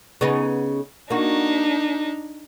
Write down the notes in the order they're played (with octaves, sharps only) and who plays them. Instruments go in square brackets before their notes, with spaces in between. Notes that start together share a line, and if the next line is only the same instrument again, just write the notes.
[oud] C#3 B3 D#4
[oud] A#3 F#4 [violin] D4 D#4